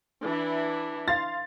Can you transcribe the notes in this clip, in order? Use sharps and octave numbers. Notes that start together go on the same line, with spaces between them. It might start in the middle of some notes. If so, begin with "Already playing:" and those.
E3 D4 E4
F5 C6 A6